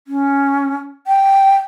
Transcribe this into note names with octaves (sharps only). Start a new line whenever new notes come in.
C#4
G5